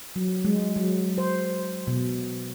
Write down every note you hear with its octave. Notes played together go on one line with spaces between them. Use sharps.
F#3
G#3
F#3
C5
B2